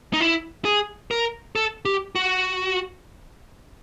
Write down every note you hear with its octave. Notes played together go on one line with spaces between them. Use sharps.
D#4
E4
G#4
A#4
A4
G4
F#4